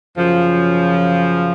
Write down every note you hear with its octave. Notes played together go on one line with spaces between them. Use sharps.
F#2 C#3 F3